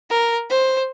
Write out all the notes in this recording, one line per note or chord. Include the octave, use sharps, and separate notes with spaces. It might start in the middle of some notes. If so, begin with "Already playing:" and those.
A#4
C5